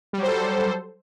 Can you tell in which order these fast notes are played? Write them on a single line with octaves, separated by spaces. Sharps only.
G3 F#3 C5 A4